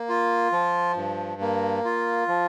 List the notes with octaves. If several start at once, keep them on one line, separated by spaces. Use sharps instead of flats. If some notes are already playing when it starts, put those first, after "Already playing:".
Already playing: A#3
F4
F3
G2
A#3
F4
F3